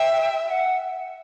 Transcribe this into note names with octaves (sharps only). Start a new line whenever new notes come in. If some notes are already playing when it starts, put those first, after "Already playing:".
Already playing: E5 G5
F#5